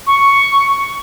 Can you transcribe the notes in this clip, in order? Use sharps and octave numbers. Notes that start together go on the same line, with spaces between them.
C#6